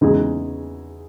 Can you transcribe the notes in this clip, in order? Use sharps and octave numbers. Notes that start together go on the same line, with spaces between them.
E2 C#3 G#3 D#4 G#4